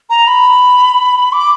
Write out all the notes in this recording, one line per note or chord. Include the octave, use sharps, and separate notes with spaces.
A#5
B5
D6